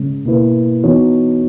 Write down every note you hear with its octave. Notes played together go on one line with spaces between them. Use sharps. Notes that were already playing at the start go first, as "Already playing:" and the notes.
Already playing: C#3 G#3 C#4
B2 A#3 E4 B4
E3 B3 D#4 F#4 C#5